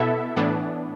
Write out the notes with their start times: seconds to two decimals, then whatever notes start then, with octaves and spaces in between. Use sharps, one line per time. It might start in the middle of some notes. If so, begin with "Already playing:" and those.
Already playing: B2 B3 E4 A4 E5
0.36 A2 E3 B3 D4